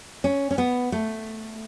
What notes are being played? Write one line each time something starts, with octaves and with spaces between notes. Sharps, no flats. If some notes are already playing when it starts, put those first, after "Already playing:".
C#4
C#4
B3
A3